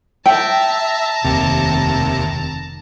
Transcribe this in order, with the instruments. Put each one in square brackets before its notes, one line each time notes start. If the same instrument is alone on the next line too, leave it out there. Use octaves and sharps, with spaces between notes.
[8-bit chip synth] E5 [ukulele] G5 [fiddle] A5 A#5
[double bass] F1 D#3 [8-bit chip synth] D#2 C3